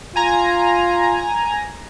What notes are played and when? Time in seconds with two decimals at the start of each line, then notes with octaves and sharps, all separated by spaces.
0.16 F4 G#5 A#5